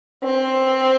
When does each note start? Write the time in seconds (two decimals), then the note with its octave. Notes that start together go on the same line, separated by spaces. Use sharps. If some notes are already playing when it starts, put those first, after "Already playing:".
0.24 C4